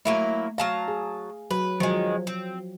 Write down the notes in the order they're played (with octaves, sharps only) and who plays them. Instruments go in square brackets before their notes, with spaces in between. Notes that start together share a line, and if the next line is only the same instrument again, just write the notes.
[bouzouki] F#3 A#3 E4 [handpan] A3
[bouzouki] F#3 A5 A#5 [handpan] F5
[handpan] G#4
[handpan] F#3 [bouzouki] B4
[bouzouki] D#3 G#3 [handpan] F3 F#3
[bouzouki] C4